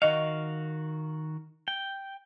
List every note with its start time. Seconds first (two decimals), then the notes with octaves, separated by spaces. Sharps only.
0.02 D#3 F#4 D#5 F5
1.68 G5